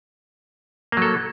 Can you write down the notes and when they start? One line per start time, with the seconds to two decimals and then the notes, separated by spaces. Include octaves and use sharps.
0.92 A#3
0.97 F#3
1.02 A4